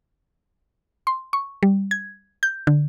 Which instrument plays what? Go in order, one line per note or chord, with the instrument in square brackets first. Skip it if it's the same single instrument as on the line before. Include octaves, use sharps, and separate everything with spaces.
[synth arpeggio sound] C6
C#6
G3
G#6
G6
D3